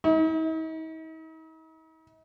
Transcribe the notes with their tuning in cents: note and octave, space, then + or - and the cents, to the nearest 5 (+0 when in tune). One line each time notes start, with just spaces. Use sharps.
D#4 +45